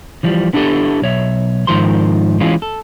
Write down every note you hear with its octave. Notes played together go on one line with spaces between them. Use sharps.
E3 F3 G3
B3 D4 E4 F4 G4 A4
B1 C#5 E5
G#2 D#3 F3 A#4 C5 C6
E3 G#3 C#4 F4
A4